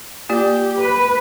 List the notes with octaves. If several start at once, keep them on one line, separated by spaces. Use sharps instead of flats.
A#3 F4 G4 D5
B4